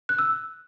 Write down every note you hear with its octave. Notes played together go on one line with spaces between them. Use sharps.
F#6
E6